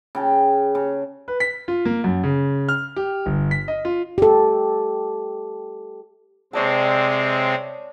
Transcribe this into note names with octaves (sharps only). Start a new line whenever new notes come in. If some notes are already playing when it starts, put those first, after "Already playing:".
C#3 G5 A5
C#3
B4
B6
F4
A#3
F#2
C#3
F6
G4
G1
B6
D#5
F4
G4 A4
C3 G#3 C4 C#5 D5 A5